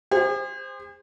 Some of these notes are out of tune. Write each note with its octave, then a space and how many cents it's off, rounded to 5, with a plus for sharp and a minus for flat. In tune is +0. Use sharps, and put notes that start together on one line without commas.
G#4 -45 C5 +0